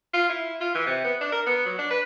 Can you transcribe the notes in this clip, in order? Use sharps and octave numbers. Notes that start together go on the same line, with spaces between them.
F4
E4
F4
E3
C3
B3
D4
A#4
B3
F#3
D4
B4